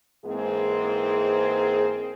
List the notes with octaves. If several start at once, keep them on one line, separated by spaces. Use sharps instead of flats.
G#2 E3 G#3 A#3 C4 G#4